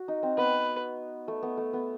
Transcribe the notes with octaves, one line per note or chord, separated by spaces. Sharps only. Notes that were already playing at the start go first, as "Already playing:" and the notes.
Already playing: F#4
D#4
C4
B3 B4
A3
B3
A3
B3